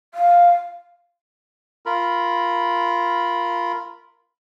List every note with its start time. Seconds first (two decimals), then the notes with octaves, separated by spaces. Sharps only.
0.14 F5
1.86 F4 A#4 B5